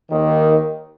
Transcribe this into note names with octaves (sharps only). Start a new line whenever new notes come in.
D#2 D#3